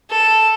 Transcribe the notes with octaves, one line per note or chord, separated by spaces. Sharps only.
A4